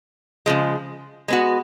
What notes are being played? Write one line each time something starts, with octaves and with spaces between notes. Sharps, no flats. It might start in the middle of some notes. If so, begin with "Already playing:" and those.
C#3 F3 G#3
G#3 B3 F#4